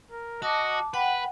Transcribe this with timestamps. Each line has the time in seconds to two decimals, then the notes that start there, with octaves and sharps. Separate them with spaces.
0.11 A#4
0.42 F#4 D#5 A5 D6
0.94 B4 F#5 G5 B5